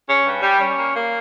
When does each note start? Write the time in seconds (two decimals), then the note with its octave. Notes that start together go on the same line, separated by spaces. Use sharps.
0.08 C#4
0.25 G2
0.42 G3
0.60 C#4
0.77 A#3
0.94 A#3